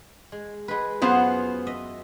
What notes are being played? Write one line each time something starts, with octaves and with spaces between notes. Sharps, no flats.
G#3
G#3 B4
F#2 B3 F4 G#4 C5 F#5
D#5 E5